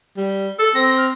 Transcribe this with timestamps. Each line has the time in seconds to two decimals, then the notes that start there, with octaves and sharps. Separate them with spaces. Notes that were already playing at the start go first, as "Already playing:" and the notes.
0.17 G3
0.59 A4
0.75 C4 A#6
0.97 F6